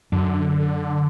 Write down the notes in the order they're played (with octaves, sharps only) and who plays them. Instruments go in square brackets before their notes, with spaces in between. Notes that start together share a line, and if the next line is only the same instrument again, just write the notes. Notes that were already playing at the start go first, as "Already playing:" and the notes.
[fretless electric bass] F#2 [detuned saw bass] D3